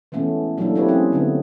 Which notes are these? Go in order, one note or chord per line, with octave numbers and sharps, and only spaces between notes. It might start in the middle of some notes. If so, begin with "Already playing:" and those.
E3 G#3 A3 B3 C#4
F#3 A3 A#3 D4 E4 A4
C4 E4 G4 B4 C#5
F#3 C4 C#4 G#4
D3 A3 B3